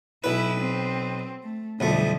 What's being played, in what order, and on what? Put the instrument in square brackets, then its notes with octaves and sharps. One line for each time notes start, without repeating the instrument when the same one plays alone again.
[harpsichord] B1 B4 [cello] E4
[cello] C4
A3
[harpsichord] B1 F2 A3 [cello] D3 G3